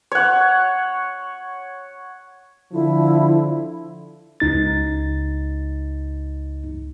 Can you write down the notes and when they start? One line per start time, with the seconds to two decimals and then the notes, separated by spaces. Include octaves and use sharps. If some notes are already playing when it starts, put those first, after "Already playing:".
0.12 C#5 F#5
2.73 D3 F3 E4
4.40 C#2 D#4 A6